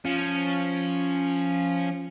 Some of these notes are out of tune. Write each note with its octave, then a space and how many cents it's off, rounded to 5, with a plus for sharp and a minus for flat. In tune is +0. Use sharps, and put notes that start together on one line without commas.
F3 +0 C#4 +0